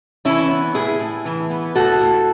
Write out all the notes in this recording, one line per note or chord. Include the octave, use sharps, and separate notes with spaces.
E3 C#4 E4
B3
A2 E4 G#4
A2
E3
B3
A2 F#4 A4
A2